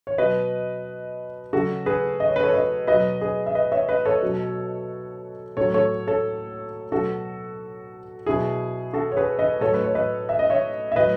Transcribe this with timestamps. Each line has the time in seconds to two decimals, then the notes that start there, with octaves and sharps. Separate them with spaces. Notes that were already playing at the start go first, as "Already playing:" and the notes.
0.07 C#5
0.18 B2 F#3 B4 D#5
1.53 C#3 F#3 F#4 A4
1.86 G#4 B4
2.20 D#5
2.28 C#5
2.36 B4
2.43 A4 C#5
2.54 B4 D#5
2.87 B2 F#3 B4 D#5
3.21 G#4 B4
3.46 E5
3.55 B4 D#5
3.72 C#5 E5
3.89 B4 D#5
4.05 A4 C#5
4.23 B2 F#3
5.57 A2 F#3 A4 C#5
5.74 A4 C#5
6.07 A4 C#5
6.92 B2 F#3 F#4 A4
8.26 B2 F#3 E4 G#4
8.93 F#4 A4
9.12 C#5
9.17 G#4 B4
9.39 B4 D#5
9.61 A2 F#3 A4 C#5
9.74 B4
9.84 C#5
9.95 B4 D#5
10.29 E5
10.39 D#5
10.50 C#5 E5
10.92 E5
10.96 A2 F#3 B4 D#5